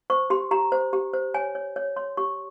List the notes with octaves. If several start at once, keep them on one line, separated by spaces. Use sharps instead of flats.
C5 C#6
G4 C6
G4 A#5
C5
G4
C5
C#5 G#5
C#5
C#5
C#5 C6
G4 C#6